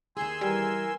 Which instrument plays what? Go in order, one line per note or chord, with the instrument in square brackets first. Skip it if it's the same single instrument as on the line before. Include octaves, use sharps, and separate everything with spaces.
[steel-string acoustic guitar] D#2 G#4 [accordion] G#5 C6 E6
[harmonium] E3 A#4 [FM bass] G3